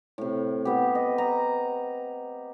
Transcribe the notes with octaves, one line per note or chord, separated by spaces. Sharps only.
A2 C3
B3 G4
D#5
A#5